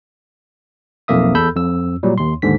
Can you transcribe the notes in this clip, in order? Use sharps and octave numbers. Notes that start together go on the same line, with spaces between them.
B1 F2 A#3 E5 D#6
E2 A4 B5 E6 G6
F2 E6
A#2 F#3 G3
D#2 C6
D#2 G#2 D3 B6